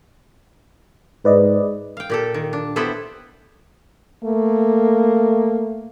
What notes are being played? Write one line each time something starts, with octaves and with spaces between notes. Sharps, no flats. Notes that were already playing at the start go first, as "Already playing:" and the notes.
G#2 B4 D5 D#5
F5 G5
A#2 G4 A4
D#3
D4
B3 E4 G4 A4 B4 C5
A3 A#3